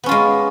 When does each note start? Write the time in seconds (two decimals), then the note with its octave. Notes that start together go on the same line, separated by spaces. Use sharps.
0.04 B3
0.06 C#4
0.09 F4
0.11 G#3